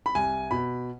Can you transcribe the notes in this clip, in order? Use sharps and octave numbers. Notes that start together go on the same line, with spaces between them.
B5
C2 G#5
B2 B5